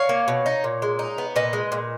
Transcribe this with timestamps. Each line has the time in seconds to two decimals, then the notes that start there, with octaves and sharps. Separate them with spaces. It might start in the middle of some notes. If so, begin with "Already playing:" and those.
Already playing: C#5 F5
0.09 A#3
0.28 B2
0.46 D#4
0.64 A#2
0.82 G#3
0.99 D#4
1.18 B3
1.36 A#2 B4 D#5
1.53 G#3
1.72 A#2